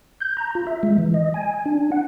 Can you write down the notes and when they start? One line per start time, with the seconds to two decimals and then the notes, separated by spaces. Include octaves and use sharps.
0.21 G6
0.37 A#5
0.55 F4
0.67 E5
0.83 G#3
0.98 E3
1.14 D#5
1.34 G#5
1.65 D4
1.92 F#5